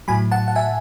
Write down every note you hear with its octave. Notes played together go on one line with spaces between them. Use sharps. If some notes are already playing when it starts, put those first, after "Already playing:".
A2 F#3 G#5 B5
F#5 A5
F#5
E5 G#5